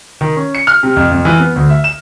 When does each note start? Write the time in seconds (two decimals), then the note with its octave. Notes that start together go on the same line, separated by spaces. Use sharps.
0.21 D#3
0.36 C#4
0.55 C#7
0.67 F6
0.83 C3
0.96 F2
1.12 F2
1.25 E3
1.40 B3
1.56 D2
1.70 E5
1.84 E7